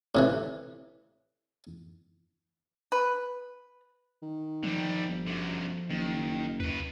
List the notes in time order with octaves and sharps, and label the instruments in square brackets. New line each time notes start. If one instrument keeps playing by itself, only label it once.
[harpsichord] A2 C3 E3
[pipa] B4
[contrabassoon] D#3
[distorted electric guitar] D3 G3 [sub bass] F3
[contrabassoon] G1
[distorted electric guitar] F#2 D3
[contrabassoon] F#1 [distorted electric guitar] D#2
[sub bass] D#2 [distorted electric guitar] C#3 B4